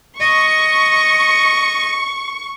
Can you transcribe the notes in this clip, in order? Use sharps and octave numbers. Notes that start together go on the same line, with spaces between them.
D#5 C#6